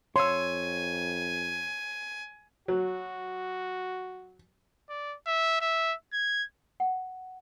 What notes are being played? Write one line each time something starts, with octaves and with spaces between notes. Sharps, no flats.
F2 C#5 G#5 C6 E6
F#3 F#4
D5
E5
E5
G#6
F#5